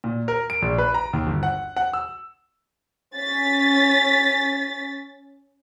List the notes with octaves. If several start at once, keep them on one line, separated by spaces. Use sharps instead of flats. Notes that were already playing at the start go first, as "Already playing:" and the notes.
A#2
A#4
D7
A#1
B4
A#5
D#2
G1
F#5
F#5
E6
C#4 A6 B6